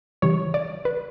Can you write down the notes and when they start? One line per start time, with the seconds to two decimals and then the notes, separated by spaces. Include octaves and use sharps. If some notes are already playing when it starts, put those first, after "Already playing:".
0.22 C#3 E3 G3 C#5
0.54 D5
0.85 B4